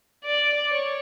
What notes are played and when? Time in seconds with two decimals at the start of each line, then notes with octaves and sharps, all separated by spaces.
0.25 D5
0.71 C#5